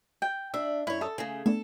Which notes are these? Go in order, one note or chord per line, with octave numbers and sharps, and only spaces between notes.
G5
D4 E5
F#2 E4 C#5
A4 E5 D#6
C#3 A3 G#4
A3 B3 D4 A4